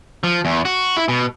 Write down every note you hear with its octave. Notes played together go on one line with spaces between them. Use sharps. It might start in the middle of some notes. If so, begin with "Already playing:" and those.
F3
E2
F#4
E4
B2